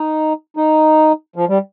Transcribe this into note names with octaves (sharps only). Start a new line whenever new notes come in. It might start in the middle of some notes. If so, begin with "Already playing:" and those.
Already playing: D#4
D#4
F3
G3